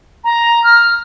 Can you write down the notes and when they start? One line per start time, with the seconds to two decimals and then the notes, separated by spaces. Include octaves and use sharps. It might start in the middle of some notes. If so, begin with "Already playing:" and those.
0.24 A#5
0.64 F6